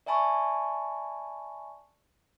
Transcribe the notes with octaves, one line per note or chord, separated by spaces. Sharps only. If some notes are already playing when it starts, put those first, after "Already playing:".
D5 E5 G#5 A5 B5 C#6